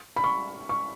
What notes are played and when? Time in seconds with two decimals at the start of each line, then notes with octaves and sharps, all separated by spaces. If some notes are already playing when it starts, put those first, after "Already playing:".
0.16 B5
0.24 C#6
0.69 C#6